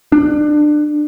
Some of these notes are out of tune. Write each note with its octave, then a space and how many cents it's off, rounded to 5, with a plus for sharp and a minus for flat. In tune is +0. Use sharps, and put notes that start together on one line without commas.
D4 +25